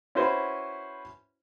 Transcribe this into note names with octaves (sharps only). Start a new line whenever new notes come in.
C#4 E4 F#4 B4 C5